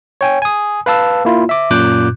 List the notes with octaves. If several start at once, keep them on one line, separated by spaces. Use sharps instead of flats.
C#5 G5 G#5
G#5 D#6
B4 F5 A5 E6
A#3 E4 F4
E5 D6
F#2 A#2 D6 F#6 G6